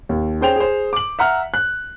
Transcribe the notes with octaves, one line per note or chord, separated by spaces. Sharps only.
D#2
C#4 G#4 C5 G5 F7
G#4 C5
D6 F#7
E5 F#5 A#5 F6
F#6